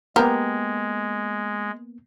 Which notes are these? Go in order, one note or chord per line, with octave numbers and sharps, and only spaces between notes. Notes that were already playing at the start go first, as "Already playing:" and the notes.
G#3 A#3 B3 G4 A#4